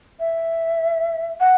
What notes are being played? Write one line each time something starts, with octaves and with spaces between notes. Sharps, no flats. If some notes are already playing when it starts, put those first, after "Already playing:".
E5
F#5